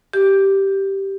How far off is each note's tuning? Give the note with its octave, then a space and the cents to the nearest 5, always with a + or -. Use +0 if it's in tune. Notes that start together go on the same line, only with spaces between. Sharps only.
G4 -5